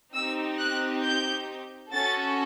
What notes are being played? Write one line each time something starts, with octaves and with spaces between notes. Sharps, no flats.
C4 D#4 G4 E6
F#6
G6
C#4 F#4 A4 A6